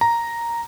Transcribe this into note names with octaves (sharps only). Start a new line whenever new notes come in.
A#5